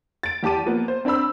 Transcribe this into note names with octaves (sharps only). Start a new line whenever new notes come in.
A6 D7
E2 G4 A5 D6 D#7
F3 A#3 B3
C5
C4 D4 C5 B5 E6